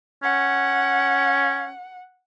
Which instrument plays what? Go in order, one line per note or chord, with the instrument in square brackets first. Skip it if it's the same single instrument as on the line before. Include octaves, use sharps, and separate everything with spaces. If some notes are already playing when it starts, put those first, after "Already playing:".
[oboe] C#4 [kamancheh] F#5